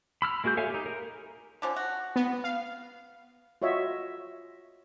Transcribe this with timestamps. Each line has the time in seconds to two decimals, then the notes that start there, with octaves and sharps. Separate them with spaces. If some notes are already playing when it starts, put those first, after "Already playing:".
0.22 B5 E6 F6
0.44 G#3 A#3 F#4 G#4 G6
0.57 A4 C#5 E5 F5 G#5
0.70 D#4 G4
0.86 A#4
1.62 D3 F3 C#4
1.76 F#4
2.16 B3
2.44 F5
3.62 F4 F#4 C#5 D#5 E5